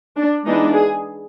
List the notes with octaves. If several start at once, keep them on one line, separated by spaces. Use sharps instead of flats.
D4
E3 G#3 B3 D4 D#4
G#4